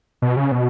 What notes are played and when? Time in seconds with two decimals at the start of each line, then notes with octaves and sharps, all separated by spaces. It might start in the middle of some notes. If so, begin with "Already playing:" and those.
0.22 B2
0.37 C#3
0.52 B2